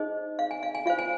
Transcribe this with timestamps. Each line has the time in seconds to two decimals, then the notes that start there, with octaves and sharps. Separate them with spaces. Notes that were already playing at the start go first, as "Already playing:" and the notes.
Already playing: D#4 G#4 C5 D#5
0.39 F5
0.51 G#5
0.63 F5
0.75 G#5
0.86 F4 C5 F5
0.99 G#5